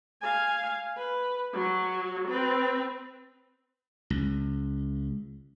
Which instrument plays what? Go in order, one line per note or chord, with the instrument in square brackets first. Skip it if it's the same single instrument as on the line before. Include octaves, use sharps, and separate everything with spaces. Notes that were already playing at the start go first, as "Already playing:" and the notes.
[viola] F5 G#5
B4
F#3
C4 B4
[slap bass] C#2